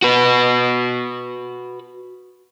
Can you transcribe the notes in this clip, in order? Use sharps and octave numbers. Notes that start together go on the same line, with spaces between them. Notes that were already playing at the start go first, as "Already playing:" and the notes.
F#4 B4